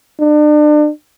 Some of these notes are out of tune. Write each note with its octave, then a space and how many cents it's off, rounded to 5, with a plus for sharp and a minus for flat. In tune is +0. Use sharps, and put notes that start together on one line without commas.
D4 +35